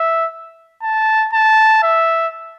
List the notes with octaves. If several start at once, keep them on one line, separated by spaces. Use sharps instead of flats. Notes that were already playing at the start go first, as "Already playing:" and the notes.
Already playing: E5
A5
A5
E5